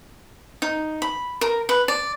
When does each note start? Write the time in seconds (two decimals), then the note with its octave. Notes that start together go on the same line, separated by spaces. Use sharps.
0.62 D#4
1.02 B5
1.41 A#4
1.69 B4
1.88 D5